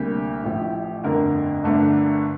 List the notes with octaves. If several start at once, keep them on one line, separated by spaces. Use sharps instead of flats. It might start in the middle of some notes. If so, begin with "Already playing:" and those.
Already playing: D2 C3 G3 A#3 G4
A1 A2 F3
G1 F2 D3 A3 A#4
G1 G2 D3 A3 D4